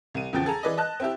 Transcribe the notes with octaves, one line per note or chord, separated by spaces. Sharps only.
C2 D#7
E2 C#3 F3 G5 A6
G#4 A4 A#5
E3 G#4 B4 D5 D#5
D#5 A5 F#6
C4 E4 G4